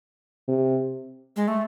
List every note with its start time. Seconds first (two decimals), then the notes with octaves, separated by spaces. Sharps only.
0.48 C3
1.36 G#3
1.48 A3